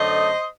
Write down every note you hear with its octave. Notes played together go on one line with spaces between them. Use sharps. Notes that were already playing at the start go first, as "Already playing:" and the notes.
Already playing: F#2 D3 A3 C5 D#5